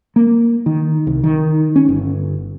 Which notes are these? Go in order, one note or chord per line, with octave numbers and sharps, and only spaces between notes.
A#3
D#3
C2
D#3
C#4
G1